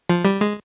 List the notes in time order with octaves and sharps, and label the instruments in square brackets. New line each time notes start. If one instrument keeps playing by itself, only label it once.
[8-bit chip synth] F3
G3
G#3